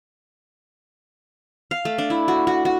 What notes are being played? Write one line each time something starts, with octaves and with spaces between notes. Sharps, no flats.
F5
A3
D4
E4
F#4
F#4
F#4